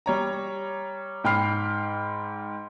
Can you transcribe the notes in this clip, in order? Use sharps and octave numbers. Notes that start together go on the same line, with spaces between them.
G3 C#5 A#5
G#2 G5 B5 F6 C7